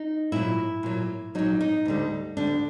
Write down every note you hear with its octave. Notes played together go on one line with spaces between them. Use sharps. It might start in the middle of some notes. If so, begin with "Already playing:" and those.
Already playing: D#4
A#2 F#3 E4
A#2 F#3
A#2 F#3 D#4
D#4
D2 D3 G3
D2 D3 G3 D4